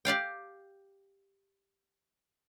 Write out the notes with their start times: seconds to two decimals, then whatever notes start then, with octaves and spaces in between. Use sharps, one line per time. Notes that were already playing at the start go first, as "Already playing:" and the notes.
0.05 G4 D5 F5 G5